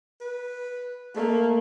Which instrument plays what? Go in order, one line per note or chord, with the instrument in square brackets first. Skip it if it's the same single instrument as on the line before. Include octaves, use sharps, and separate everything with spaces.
[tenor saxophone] B4
[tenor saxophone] A3 [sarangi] A#3